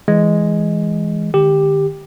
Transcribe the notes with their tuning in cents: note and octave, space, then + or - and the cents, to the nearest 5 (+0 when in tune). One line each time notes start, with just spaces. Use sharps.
E3 +0 G#3 +0
D#3 -45 G4 +5